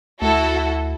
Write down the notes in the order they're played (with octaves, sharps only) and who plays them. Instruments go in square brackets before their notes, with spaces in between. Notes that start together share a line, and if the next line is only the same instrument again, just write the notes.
[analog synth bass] D2 [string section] E4 F#4 A4